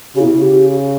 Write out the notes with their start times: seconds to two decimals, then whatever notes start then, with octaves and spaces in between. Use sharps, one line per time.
0.15 C#3 G4
0.21 B2 E4
0.32 C#3
0.42 G4